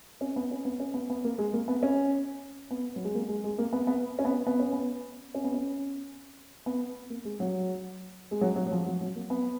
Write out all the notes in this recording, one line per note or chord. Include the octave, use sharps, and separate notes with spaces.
C#4
B3
C#4
B3
C#4
B3
B3
A#3
G#3
A#3
B3
C#4
B3
F#3
G#3
A#3
G#3
G#3
A#3
B3
B3
C#4
B3
B3
C#4
B3
C#4
B3
C#4
B3
A#3
G#3
F#3
G#3
F#3
F#3
F#3
F3
F#3
F#3
A#3
B3